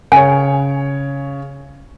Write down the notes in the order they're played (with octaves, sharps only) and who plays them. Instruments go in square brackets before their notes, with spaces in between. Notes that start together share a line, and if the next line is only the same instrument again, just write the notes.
[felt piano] C#3 C#5 [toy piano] G#5